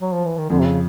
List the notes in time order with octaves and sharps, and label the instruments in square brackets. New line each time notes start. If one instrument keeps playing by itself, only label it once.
[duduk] F#3
F3
E3
D#3
[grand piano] F2 [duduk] D3
[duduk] C3
C#3